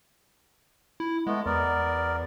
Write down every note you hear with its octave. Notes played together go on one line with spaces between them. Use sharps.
E4
G#3 A3 B3
E2 B3 A#4 D5